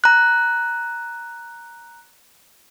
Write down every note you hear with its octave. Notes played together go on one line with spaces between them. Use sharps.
A#5 F#6